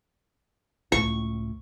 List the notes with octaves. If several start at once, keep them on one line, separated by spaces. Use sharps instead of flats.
C#2 A2 C#6